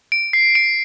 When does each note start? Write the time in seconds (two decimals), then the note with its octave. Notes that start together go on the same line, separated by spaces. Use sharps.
0.12 D7
0.33 C7
0.55 D7